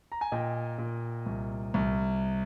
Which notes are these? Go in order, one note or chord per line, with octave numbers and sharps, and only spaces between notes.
A#5
G#5
A#2 D#5 G5
A#2
C2
C2